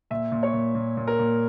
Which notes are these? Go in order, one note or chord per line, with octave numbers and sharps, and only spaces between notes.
A#2 E5
A#2
C#5
A#2
A#2
A#2
A#4
A#2